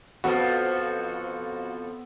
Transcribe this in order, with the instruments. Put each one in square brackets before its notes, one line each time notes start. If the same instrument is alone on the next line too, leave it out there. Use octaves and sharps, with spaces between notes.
[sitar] F2 F3 [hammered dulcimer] B3 A4 [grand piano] F#4